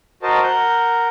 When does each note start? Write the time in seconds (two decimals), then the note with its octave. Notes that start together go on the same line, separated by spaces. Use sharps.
0.23 F#4 A#4 C5 D#5 A5
0.43 A#4 F#5 G6